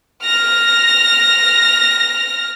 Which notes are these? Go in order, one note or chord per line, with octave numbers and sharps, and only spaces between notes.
F6 A#6